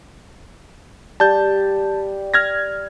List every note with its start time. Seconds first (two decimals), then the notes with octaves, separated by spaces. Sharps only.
1.20 G3 A5 G6
2.34 F6 G#6 A#6